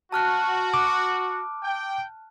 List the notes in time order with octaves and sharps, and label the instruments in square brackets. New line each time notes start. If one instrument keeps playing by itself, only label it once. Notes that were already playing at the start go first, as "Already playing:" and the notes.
[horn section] F#4 [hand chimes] A5 F6 F#6
[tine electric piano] D6
[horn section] G5